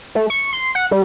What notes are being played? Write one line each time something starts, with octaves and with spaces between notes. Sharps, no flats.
A3
C#6
C6
F#5
G3